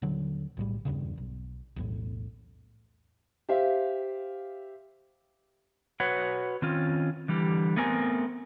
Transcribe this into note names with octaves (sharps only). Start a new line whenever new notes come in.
D#1 D3 F#3
B1 A2 G3
D#1 E2 G2 C#3
B1
B1 E2 A2
G4 C5 E5 F5
F#4 B4 C#5 F#5
D#3 C4 C#4 F4
D3 E3 G3 G4
A3 B3 C4 A#4 F#5 G#5